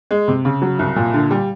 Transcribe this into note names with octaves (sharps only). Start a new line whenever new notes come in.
G#3
C3
C#3
F#3
C2
A#2
D3
G3